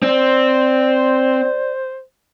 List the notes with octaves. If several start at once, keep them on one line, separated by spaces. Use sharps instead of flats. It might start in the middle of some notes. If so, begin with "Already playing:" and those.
C4 C5 D5